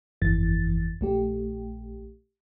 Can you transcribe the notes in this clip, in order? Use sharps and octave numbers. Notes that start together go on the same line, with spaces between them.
G1 F2 E3 A6
A#1 A3 G4